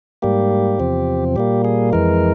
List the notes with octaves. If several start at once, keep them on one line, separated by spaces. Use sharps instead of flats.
G#2 G3 A#3 G4
E2 C3 F3 C4
A#2 G3 A#3 G4
G#4
F2 E3 G#3 A#4